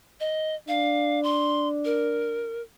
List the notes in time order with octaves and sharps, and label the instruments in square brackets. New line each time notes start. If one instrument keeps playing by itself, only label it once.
[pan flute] D#5
[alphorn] D4 [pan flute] F5
[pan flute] C6
A#4